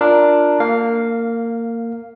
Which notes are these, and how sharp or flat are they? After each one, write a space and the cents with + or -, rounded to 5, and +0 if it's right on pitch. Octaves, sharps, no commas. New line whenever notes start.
D4 +5 F4 +0 A#4 +0
A#3 -20 F5 +0